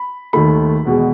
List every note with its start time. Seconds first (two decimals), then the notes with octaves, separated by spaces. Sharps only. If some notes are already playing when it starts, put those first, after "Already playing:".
Already playing: B5
0.33 D#2 D#3 A3 B5
0.85 E2 B2 G#3